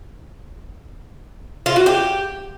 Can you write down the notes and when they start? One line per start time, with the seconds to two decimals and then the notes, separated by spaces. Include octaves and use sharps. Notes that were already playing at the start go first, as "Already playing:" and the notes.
1.66 F4
1.76 F#4
1.86 G4